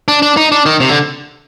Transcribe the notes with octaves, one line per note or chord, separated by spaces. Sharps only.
D4
D4
D#4
D4
D#3
C3
D3